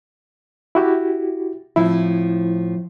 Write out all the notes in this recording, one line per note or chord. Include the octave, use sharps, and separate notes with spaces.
E4 F#4 G4
A2 F3 C4 E4